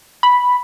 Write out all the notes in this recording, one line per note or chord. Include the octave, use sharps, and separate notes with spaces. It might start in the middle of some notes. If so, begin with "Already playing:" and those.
B5